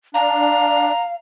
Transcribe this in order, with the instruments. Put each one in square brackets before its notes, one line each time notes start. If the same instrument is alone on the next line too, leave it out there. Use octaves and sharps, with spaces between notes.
[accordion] D4 [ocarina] F5 [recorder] A#5